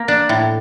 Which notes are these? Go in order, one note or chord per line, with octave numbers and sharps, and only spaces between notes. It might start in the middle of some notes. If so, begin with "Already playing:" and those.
Already playing: A#3
D4
A2